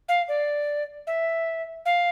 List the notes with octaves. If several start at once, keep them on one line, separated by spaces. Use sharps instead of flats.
F5
D5
E5
F5